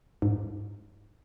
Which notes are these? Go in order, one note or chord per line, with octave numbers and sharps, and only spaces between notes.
G#2